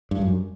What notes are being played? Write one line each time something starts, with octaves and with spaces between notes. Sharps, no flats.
G2
F#2